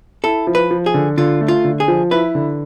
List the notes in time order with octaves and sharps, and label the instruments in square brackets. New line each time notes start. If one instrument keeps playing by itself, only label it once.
[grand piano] E4 [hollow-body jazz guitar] A4
[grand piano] F3
[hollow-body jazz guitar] B4
[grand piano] F3
[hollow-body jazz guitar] G#4
[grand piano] D3
[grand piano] D3 [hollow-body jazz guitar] F4
[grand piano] A3
[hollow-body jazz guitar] F4
[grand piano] D3
[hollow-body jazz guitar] G#4
[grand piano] F3
[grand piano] E4 [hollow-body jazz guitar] B4
[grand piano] D3